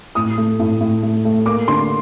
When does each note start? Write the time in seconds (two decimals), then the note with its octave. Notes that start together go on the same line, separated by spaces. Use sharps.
0.15 A2 D#6
0.38 A3
0.60 A2
0.81 A2
1.03 A3
1.25 A3
1.46 A#3 D6
1.68 D3 C6